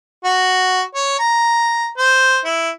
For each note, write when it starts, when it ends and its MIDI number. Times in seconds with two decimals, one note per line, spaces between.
0.24 0.82 66
0.95 1.18 73
1.19 1.88 82
1.98 2.38 72
2.45 2.70 64